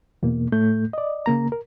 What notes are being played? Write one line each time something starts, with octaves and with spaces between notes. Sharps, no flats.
E2 B2 A#3
A2 A3 G6
D5 D#5
C#3 A#3 A#5
A#4